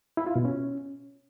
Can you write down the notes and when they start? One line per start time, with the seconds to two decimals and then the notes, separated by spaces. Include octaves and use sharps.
0.17 E4
0.26 F4
0.36 B2
0.45 C#4